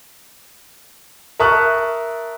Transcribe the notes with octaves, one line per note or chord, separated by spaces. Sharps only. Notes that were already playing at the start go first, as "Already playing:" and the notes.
A#4 E5 A5 C#6 D#6 F#6